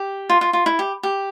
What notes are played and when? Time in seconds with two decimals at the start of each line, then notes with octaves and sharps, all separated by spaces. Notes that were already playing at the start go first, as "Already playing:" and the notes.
Already playing: G4
0.30 F4
0.41 F4
0.53 F4
0.66 E4
0.79 G4
1.03 G4